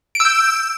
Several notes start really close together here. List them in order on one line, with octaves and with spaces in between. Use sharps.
D7 E6 G6